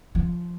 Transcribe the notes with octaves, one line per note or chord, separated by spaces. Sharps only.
F3